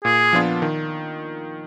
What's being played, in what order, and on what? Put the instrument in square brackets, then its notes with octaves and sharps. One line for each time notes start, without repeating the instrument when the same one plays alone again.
[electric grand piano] A#2 [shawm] G#4
[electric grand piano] F3 B3 D4 F4
D#3